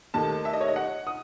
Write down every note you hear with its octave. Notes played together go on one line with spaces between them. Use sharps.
D#2 D#3 A3 A5
E5
D#5
C#5
D#5
F#5
D#6